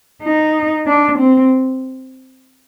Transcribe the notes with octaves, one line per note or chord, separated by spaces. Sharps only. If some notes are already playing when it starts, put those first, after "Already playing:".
D#4
D4
C4